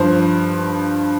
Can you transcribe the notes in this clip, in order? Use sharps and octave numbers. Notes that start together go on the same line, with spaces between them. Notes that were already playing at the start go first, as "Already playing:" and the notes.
Already playing: G2 F3 C5